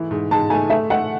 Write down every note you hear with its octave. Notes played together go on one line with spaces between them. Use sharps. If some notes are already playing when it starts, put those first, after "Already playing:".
Already playing: G#2 E3 A3 E4
G#2
G#2 A5
A3 G#5
A3 E5
A3 F#5